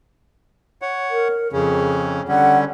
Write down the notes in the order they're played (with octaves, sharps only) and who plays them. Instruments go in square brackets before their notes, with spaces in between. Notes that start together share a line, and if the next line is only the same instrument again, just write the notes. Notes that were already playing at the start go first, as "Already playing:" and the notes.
[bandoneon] C#5 F#5
[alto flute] A#4
[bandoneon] F2 C#3 C#4 [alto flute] G#4
[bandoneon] D3 G3 C#4 [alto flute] F#5